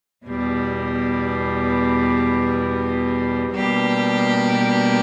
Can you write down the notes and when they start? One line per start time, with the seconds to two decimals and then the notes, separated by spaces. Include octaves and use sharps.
0.24 E2 B2 G3
3.52 B2 G3 A#3 D4 G4